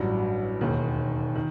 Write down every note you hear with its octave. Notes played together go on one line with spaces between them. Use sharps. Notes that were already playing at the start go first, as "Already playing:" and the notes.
Already playing: A1 G2 F#3
E1 D#2 D#3
D#3